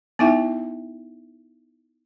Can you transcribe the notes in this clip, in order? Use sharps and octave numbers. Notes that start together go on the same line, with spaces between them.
B3 D#4 E4 E5 G5